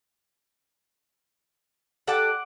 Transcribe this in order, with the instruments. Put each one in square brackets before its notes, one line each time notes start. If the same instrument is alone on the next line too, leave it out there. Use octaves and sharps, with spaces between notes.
[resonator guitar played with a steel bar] G4 A4 D5 [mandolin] F#5 D6